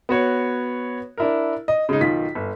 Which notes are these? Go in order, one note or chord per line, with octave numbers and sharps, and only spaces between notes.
B3 F#4 C#5
D4 E4 A#4
D#5
C#3 G#3 D#4
B1 D#3 F4 B6
G1